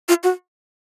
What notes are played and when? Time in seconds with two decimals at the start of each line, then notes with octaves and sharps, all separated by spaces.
0.09 F4
0.23 F#4